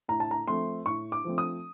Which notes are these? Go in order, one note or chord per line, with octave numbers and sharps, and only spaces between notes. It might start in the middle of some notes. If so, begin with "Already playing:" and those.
A2 A#5
A5
A#5
F3 A3 C4 C6
A2 C#6
D6
F3 A3 C4
D#6